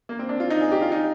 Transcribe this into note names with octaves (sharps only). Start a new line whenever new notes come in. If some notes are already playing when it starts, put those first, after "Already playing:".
A#3
C4
D4
F4
D#4
G#4
G4
F4
D#4